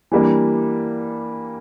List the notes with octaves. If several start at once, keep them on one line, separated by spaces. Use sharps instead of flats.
E3 G3 A#3 D4